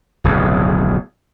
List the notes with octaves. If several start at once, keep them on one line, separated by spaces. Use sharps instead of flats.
D1 B1 F2 C#3